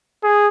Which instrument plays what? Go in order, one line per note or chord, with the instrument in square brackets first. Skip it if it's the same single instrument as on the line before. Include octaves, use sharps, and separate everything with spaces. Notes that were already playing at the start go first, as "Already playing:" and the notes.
[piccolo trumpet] G#4